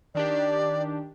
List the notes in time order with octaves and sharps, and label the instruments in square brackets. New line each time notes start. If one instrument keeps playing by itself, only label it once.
[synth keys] D#3 D4 G4 [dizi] D5